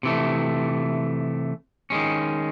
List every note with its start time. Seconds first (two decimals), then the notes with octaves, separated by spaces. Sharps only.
0.03 C3 E3 A3
1.90 D#3 G#3 C#4